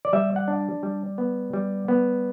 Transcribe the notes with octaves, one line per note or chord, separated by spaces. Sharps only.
D5
G3 E5
F#5
D4
G3
B3
G3
B3